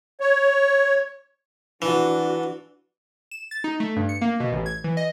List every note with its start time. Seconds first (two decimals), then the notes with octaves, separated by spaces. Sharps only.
0.20 C#5
1.82 E3 D4 F#4
3.31 E7
3.51 A6
3.64 D#4
3.80 A3
3.96 G2
4.09 C#7
4.21 A#3
4.40 B2
4.52 A1
4.66 G#6
4.84 E3
4.97 D#5